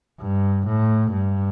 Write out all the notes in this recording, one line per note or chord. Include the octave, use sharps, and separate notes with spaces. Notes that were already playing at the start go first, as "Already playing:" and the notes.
G2
A2
G2